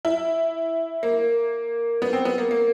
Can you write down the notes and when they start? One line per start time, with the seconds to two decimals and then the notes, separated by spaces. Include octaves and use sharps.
0.05 E4
1.03 A#3
2.02 B3
2.13 C4
2.25 B3
2.38 A#3
2.51 A#3